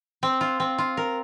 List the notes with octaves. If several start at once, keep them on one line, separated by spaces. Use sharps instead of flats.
C4
F4
C4
F4
A#4